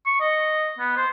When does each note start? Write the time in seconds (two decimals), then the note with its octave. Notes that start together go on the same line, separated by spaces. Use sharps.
0.06 C#6
0.21 D#5
0.79 B3
0.97 C5